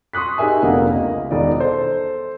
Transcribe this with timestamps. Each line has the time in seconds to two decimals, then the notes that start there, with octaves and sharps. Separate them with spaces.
0.13 C6 C#6 D#6 F#6 B6
0.38 D#4 G4 G#4 A#4 E5 G#5
0.63 F1 D3 A#3 B3 A#4 F#5
0.94 C#2 D#5
1.31 E1 D#3 D5 D#5
1.60 A4 C5